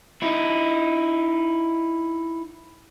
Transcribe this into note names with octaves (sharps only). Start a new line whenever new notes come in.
D#4 E4